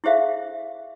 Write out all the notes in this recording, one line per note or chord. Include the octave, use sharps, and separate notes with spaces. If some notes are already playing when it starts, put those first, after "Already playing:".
E4 G4 G#4 C5 E5 F5